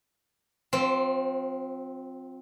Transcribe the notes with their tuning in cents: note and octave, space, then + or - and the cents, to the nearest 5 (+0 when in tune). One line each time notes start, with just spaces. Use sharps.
F3 +35 C4 +0